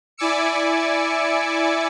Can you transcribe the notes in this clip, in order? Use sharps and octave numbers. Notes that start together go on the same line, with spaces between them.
E4 D5 G#5 D6 E6 C#7